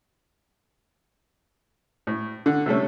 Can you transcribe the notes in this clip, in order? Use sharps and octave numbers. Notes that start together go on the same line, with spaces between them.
A2
D3
C3 G3 A3 C#4